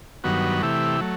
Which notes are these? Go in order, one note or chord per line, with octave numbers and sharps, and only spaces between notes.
G2 D#3 F#3 B3 F#4
C3 E3 A3 E4 G4
F#3 A3